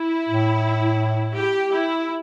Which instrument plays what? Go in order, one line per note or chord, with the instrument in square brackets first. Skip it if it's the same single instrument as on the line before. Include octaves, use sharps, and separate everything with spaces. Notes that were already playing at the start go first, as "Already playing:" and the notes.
Already playing: [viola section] E4
[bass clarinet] A2
[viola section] G4
E4